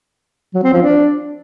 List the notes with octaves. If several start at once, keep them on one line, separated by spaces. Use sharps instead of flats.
F#3
C4
F3
D4